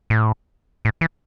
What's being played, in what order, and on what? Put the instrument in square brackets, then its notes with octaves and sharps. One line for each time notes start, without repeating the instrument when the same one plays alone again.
[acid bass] A2
A2
E3